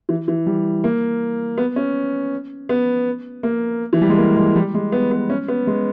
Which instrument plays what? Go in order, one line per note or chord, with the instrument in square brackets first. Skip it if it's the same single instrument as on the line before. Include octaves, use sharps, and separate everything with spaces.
[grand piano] E3
E3
G3
A#3
B3
C#4
B3
A#3
E3
G3
G#3
A#3
G#3
G3
G#3
B3
B3
C#4
B3
G#3